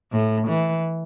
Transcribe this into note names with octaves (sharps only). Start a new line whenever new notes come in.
A2
E3